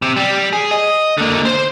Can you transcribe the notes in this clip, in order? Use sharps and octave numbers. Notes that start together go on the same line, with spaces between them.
C3
G3
G#4
D#5
D3 A#3
C5 C6